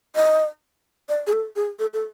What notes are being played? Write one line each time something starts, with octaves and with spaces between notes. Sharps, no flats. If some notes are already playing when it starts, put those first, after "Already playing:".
D#5
D5
G#4
A4
G#4
A4
A4